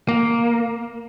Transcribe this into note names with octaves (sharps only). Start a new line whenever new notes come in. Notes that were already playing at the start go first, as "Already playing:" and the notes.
A#3